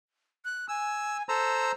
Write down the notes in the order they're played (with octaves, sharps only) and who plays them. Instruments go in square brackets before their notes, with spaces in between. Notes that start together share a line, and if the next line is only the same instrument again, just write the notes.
[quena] F#6
[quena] G#5 [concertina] E6
[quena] A4 [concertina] C5 A#5 E6